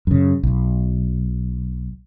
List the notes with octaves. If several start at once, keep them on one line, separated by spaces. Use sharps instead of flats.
F#2 C#3
B1